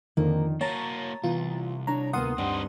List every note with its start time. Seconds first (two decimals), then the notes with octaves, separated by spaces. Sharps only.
0.17 F2 D3 D#3 A#3
0.61 A#3 F#4 C#5 A5 A#5 A6
1.24 C2 E3 B3 F4
1.87 D4 C#5 A#5
2.13 D2 A#3 B3 F4 F#5 C6 D#6
2.38 G2 C4 D#4